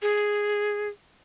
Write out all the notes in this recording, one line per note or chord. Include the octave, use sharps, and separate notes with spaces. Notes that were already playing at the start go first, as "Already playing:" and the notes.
G#4